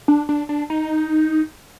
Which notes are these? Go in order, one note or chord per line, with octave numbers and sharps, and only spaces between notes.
D4
D4
D4
D#4